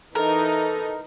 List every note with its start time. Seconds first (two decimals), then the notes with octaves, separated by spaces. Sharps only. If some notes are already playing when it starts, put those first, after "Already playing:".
0.15 E3 D#4 A4 A#4